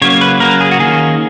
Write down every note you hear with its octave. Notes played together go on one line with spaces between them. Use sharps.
C#3 F#3 A#3 C#5
B4
C#3 F#3 A#3 A#4
G#4
F#4
D#3 A#3 C#4 G#4